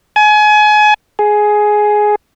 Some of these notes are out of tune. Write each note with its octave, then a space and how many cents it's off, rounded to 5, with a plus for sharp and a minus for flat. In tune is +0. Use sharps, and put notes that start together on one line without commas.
G#5 +30
G#4 +10